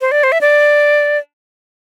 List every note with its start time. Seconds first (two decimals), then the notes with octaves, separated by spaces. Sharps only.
0.01 C5
0.12 D5
0.23 C5
0.32 E5
0.41 D5